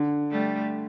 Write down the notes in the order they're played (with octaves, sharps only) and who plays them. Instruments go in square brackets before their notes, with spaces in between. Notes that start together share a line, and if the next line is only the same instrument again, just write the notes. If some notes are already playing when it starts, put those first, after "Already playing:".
Already playing: [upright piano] D3
[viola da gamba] G3 A3